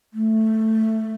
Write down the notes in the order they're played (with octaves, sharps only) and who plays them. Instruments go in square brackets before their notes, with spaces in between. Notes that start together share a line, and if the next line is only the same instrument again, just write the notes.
[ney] A3